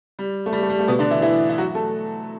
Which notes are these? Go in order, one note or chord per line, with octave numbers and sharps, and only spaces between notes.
G3
A3
G3
A3
G3
A3
B2 B3
D3 D4
E3 E4
E3 E4
E4
F#3 F#4
A3 A4